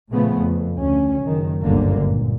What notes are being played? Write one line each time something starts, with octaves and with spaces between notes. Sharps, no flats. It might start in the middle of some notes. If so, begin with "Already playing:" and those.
A#2 C#3 F3 A3 B3
F2
D2 C#4
F#1 D#3
G1 C#2 F#2 A#2 D3 A#3
A#2